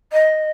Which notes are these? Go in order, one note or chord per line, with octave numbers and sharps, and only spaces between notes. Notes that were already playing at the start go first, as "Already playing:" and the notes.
D#5